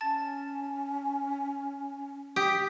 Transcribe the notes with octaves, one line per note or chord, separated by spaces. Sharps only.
C#4 A5 A6
G4 D#6 B6